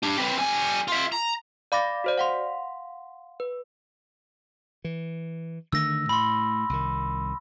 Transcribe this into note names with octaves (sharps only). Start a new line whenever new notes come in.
D4 G4
C4 B4
G3 G#5
F4 E5
A#5
D5 F5 B5 D6 A6 A#6
F#4 C5 D5
F5 F#5 C6
B4
E3
D3 D#3 A3 E6 A#6
A2 B5 C6
C2 D#3